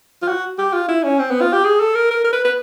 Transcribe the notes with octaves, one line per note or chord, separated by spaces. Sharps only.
F4
F#4
G4
F4
E4
C#4
C4
B3
F4
G4
G#4
A4
A#4
A#4
A#4
B4
B4